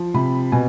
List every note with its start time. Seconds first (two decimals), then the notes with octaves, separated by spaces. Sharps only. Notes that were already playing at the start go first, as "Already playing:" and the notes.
Already playing: F3
0.14 C3 B5
0.52 B2 G#5